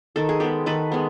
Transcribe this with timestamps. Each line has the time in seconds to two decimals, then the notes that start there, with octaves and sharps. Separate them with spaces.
0.16 D#3 A4
0.29 G#4
0.40 G#3 B3 G4 A4
0.66 D#3 A4 B4
0.92 G#3 B3